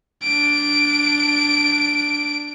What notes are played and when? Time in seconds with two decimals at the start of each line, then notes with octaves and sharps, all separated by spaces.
0.23 D4 D7